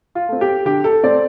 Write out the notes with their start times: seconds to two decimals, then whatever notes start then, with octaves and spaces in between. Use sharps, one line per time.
0.15 F4
0.29 A3 C4
0.41 G4
0.65 D3 G4
0.84 A4
1.03 A3 C4 D5